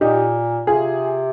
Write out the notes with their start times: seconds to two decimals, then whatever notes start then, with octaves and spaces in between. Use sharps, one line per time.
0.01 A#2 D#4 G4
0.67 C3 F4 G#4